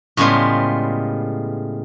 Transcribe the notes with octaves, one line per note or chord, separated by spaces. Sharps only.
A2 C#3 G3 G#3 B3 F4